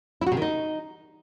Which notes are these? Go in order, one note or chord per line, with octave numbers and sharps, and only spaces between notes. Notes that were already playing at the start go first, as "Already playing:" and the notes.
E4
F#4
C3
D#3
D#4